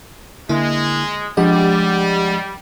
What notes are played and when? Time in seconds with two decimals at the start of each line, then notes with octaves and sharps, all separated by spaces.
0.49 D3 G#3 A#3 E4
1.37 F3 G3 G#3 D4 G4 D#5 F#5